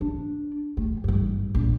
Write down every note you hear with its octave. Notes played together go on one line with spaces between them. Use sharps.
D4
A3
G#1 G2
A#1